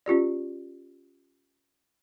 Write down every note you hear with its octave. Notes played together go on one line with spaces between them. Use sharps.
C#4 F4 G4 D5